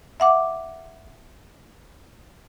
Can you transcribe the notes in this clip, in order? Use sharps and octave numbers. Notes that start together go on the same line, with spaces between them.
E5 F#5 D6